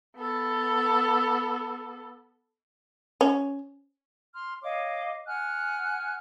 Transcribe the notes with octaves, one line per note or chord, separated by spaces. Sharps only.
B3 A4
C#4
C6 F6
C#5 D#5 F5 D6
F#5 G#5 F6 F#6